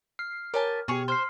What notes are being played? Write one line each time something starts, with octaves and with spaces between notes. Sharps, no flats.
F6 C7
G4 A#4 C#5 G#5 A5
B2 G4 G#4 C#5
C5 C6 F6 C7